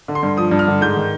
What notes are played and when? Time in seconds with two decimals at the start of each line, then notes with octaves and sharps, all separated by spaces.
0.08 D3
0.15 C6
0.23 G2
0.37 F3 D#6
0.51 G2
0.59 F6
0.67 D3
0.81 G#2 G6
0.97 D#3